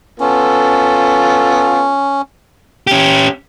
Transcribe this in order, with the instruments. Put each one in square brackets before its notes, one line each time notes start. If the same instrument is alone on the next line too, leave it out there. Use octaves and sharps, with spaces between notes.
[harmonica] B3 F4 A4 [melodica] C#4
[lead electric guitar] C#4 G4